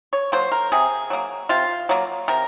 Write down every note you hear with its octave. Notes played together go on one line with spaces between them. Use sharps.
C#5
F#3 A#3 C5
A#4
C3 G#4
F#3 A#3
C3 F4
F#3 A#3
C3 A#4